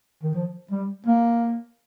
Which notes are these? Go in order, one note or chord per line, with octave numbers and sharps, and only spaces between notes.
D#3
F3
G3
A#3